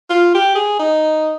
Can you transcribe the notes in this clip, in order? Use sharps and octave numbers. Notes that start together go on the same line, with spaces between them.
F4
G4
G#4
D#4